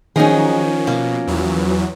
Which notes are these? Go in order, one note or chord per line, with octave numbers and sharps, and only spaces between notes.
D#3 F3 F#3 C#4 D#4 G#4
B2 A#3
E2 E3 F#3